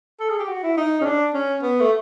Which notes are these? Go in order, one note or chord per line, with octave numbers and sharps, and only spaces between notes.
A4
G#4
G4
F#4
E4
D#4
C#4
D4
C#4
B3
A3